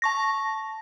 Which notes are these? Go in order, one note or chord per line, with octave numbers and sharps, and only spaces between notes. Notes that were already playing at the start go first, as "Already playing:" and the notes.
A5 C#6 A#6